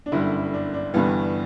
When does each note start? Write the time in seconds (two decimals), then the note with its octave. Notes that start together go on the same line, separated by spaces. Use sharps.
0.06 D4
0.12 G1 F#2 D3 G3 E4
0.54 D4
0.74 D4
0.94 G1 G2 E3 G3 B3